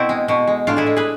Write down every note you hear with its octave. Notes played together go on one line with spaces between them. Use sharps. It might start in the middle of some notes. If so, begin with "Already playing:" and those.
Already playing: B2 C4 E4
G#3
B2
G#3
A2 D4 F4
E4 G#4
G#3
G#4 B4